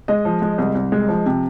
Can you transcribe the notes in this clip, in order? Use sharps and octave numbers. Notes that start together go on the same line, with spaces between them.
G#3 D#5
F3
G#3
C2
C2
G#3
F3
C3